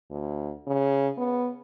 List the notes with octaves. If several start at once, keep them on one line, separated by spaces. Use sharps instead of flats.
D2
C#3
B3